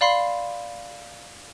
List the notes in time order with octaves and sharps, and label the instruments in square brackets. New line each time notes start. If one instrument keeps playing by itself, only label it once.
[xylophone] D5 F5 B5 C6 C7